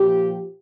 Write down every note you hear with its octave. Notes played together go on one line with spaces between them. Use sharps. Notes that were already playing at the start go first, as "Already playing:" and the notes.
Already playing: A#2 F3 G4